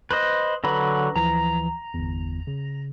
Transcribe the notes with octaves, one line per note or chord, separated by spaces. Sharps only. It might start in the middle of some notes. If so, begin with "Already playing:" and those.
B4 C5 D#5
D3 F#3 B4 A#5 B5 A#6
D2 E3 F3 A#5
G1 E2
C#3